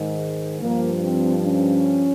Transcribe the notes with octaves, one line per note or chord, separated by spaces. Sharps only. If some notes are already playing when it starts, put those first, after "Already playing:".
Already playing: G#2 D#3
G2 F3 A#3
C4
C#4